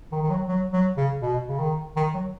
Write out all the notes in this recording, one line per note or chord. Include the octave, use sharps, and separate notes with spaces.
D#3
D#3
F#3
F#3
F#3
C#3
B2
C#3
D#3
D#3
F#3